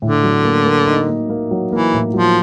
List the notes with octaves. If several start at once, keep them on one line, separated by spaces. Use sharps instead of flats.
A2 D3
F#3
A#3
A#3
D#4
A#3
A#3
F#3
E3 A#3
A2
F3 F#3